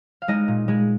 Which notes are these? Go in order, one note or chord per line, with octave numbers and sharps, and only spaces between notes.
F5
G#3 D#4 D#5
A#2
G#3 G#4